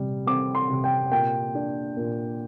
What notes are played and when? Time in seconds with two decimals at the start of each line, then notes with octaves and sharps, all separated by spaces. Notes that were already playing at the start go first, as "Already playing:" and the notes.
Already playing: C3 G3
0.27 C4 D6
0.55 C6
0.70 C3
0.84 G5
1.12 A#2 G5
1.55 D4
1.97 A#2